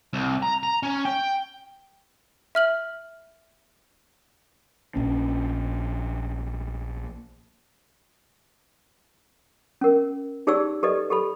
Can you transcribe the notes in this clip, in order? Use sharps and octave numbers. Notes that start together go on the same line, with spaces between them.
C2
A#5
A#5
C#4
G5
E5 F6 F#7
A#1 C#4
C#4 A#4
D#4 G4 G#4 D5 C#6 E6
G4 A4 B4 D5 D#5
G4 A4 B5